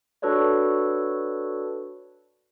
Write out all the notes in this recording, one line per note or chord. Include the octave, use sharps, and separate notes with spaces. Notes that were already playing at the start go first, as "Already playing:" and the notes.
D4 F#4 A4 B4 C#5 D5